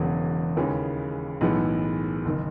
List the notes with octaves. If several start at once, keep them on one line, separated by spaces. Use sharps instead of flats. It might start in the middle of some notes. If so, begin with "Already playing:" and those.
Already playing: E1 E2 C#3 F#3
D#2 C#3 E3 G#3 C#4
B1 A2 E3 G#3 B3
F#1 D#3